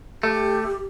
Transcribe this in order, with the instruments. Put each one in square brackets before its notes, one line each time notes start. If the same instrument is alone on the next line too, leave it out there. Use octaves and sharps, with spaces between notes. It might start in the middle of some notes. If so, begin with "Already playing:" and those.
[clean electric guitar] A3 [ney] G4